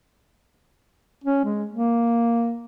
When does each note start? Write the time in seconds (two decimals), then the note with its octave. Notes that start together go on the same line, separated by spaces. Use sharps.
1.24 C#4
1.45 G#3
1.73 A#3